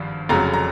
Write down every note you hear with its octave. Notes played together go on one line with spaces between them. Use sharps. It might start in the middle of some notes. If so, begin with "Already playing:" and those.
Already playing: G#1 G2 F3
F1 F2 C#3 F#3 A#5
A#5